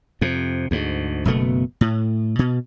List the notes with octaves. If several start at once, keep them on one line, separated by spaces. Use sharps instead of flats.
F2 C3
D2 G#2
F#1 B2 A3 B3
A2
B2